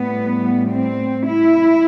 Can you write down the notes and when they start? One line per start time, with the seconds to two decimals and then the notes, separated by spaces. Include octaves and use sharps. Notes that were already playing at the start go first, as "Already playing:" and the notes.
Already playing: A2 G3 B3
0.73 C4
1.26 E4